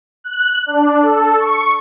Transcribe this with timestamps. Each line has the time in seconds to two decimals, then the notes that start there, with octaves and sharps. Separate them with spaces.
0.24 F#6
0.66 D4
1.02 A4
1.39 C#6